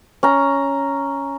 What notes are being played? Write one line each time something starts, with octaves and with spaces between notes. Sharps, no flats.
C#4 A#5